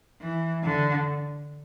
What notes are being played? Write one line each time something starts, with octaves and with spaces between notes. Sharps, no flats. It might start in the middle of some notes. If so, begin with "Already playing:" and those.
E3
D3